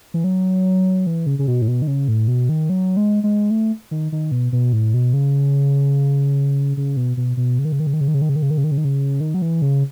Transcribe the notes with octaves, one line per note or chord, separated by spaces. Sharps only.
E3
F#3
E3
C#3
C#3
B2
A2
B2
D#3
C#3
A2
B2
D#3
F#3
G#3
G#3
A3
D#3
D#3
B2
B2
A2
B2
C#3
C#3
B2
B2
B2
C#3
D#3
C#3
D#3
C#3
D#3
C#3
D#3
C#3
D#3
C#3
D#3
C#3
D#3
C#3
D#3
C#3
D#3
C#3
D#3
F#3
E3
C#3